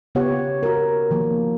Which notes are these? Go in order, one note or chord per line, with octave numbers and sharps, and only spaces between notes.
C#3 B3 F4 G4 C#5 F#5
F#4 A#4
D#3 F3 A#3